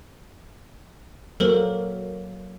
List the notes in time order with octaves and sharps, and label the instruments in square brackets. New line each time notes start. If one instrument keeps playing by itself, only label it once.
[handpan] F#3 A#3 [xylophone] A4 A#4 C5